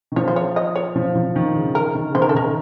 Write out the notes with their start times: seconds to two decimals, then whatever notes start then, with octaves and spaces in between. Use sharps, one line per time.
0.12 D#3
0.16 F3 C#5
0.28 C5
0.36 C#5
0.56 D#5
0.76 C#5
0.96 F3
1.15 F3
1.36 D#3
1.55 C#3
1.75 A#4
1.95 D#3
2.09 C#3
2.15 D#3 C5
2.22 A#4
2.29 A4
2.35 D#3 A#4